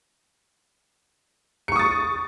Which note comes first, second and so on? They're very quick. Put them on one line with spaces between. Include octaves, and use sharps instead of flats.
C#7 C#6 D#6 A6